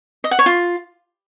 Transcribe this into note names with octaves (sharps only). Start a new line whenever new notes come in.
D#5
F#5
C#5
F4